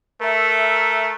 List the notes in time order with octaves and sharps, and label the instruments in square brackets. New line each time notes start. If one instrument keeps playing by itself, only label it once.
[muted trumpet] A3 [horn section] A#4 E5